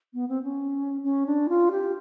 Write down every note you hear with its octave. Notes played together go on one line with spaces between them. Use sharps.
B3
C4
C#4
C#4
D4
F4
G4